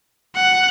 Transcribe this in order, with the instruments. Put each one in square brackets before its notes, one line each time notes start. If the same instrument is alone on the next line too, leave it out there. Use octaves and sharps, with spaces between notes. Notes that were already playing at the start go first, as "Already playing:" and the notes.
[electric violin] F#5